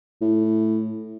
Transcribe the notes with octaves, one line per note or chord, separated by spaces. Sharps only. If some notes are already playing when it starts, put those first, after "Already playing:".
A2